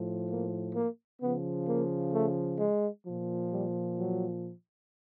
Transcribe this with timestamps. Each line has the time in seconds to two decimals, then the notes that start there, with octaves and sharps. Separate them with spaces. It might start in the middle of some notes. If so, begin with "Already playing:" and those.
Already playing: A2 F3
0.31 A#3
0.76 A#3
1.22 C#3 F3 B3
1.68 A#3
2.13 A3
2.59 G#3
3.06 A#2 F3
3.51 G3
3.97 F#3